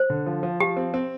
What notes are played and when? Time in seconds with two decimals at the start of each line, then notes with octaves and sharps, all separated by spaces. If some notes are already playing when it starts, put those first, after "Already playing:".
Already playing: C5
0.10 D3
0.26 F3
0.43 F3
0.60 F3 G4
0.77 C4
0.94 C4